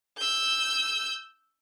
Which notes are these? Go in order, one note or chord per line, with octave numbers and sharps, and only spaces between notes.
E6 G6